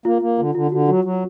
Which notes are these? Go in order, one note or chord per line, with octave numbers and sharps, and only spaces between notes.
A#3 F4
A#3
D3 F4
D3 F4
D3 F#4
F#3 F#4
F#3